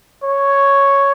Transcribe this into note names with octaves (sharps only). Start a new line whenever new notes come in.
C#5